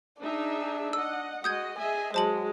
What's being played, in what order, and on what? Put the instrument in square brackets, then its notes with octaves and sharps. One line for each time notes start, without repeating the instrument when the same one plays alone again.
[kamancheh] D4 [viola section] D#4 G#4 E5
[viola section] D#5 F#5 [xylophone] E6
[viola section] G#3 D#5 [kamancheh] F#4 [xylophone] D#6 G6 G#6
[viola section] G#4 D#5 E5 [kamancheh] G#5
[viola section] F#3 [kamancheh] G#3 [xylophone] C5 A5 F#7